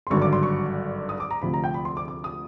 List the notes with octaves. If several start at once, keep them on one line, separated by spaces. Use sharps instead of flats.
C6
G#1 G2 D3 F#3 C#6
D6
C6
C#6
D#6
D6
A#5
D2 C3 F3 B5
A#5
G5
B5
C6
D6
D6
D#6